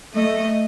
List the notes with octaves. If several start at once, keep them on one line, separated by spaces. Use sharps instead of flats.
A3 D#5